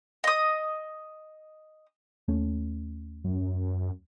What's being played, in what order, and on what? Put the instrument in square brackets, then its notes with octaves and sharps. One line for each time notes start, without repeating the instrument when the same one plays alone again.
[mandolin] D#5 D#6
[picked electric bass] D#2 A3 C#4
[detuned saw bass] F#2